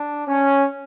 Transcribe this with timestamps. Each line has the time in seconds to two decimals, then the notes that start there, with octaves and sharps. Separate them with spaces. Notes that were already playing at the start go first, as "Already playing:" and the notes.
Already playing: D4
0.27 C#4